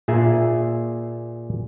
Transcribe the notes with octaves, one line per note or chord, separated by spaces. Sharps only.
A#2 G#4 E5